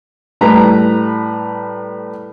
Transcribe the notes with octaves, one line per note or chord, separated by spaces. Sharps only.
A2 G3 B4 A#5